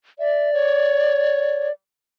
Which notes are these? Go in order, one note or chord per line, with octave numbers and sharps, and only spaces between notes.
D5 E5
C#5